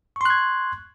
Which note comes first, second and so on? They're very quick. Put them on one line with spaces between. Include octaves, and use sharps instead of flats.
C#6 C6 F#6 G#6